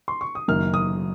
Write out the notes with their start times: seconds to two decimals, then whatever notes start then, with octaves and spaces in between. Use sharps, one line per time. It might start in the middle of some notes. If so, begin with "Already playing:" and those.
0.08 C6
0.21 C#6
0.35 D#6
0.48 F#1 F#2 D#3 A#3 F6
0.74 D#6